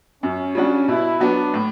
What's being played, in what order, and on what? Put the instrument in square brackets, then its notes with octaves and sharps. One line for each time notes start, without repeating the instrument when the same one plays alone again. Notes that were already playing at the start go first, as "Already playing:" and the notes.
[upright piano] F#2 [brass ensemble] C#4
[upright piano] C#3 G3 D4 F#4
[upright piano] B2 [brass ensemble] E4
[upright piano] F#3 B3 F#4 [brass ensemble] D4
[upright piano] A2